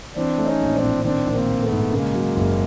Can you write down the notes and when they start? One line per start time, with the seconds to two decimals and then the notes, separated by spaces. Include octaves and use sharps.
0.16 E3 C4 D4
0.38 A3
0.46 C#4 D#4
0.61 A#1
0.75 C4 D4
0.82 A2
1.04 D#3 C4 D4
1.27 A#1
1.33 A#3 C4
1.48 A#1
1.63 A3 B3
1.71 G#2
1.92 C#3 G#3 A#3
2.15 F#3
2.36 F#1